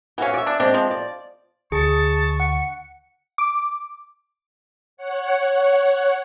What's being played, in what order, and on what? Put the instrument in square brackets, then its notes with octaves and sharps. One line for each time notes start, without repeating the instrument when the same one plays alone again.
[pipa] E3 C#4 [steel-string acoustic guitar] F#4 F5
[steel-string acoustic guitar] D5 E5
[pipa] D4
[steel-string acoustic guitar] G#3 C4 [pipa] D4
[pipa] F3
[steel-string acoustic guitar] D5
[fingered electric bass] D2 [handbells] G#4 [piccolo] A5 [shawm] C#6
[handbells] F#5 [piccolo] C#7
[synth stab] D6
[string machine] C#5 F#5